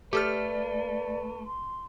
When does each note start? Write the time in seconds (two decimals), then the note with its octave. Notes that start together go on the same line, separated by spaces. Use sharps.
0.13 A3 G4 A4 B4 D5 F6
1.46 C6